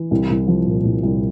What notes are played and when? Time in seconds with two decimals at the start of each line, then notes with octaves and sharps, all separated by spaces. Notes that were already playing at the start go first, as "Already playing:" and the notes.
Already playing: E3
0.11 C2
0.30 C2
0.48 F3
0.66 A#2
0.85 C2
1.03 C2